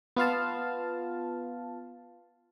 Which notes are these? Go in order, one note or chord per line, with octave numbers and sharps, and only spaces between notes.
B3 F4 F5 A5